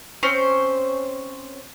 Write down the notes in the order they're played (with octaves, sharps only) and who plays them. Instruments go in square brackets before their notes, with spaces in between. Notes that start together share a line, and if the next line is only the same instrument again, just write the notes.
[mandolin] C4 C#4 C5